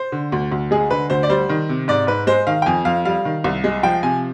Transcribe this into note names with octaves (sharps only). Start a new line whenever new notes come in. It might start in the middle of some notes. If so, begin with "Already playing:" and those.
Already playing: C5
D3
D2
D2
G#3 G#4
D3 B4
D2 C5
D5
G3 C5
D#3
C3
G#2 D5
G#2 B4
G#3 C5
D#3 F5
G5
F2 G#5
F2 F5
G3 F5
D#3
C2
G#3
F3 G5
C3 G#5